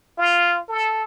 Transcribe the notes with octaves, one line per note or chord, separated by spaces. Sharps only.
F4
A4